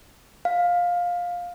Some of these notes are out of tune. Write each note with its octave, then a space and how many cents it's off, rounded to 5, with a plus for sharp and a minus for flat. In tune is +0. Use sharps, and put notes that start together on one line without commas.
F5 +15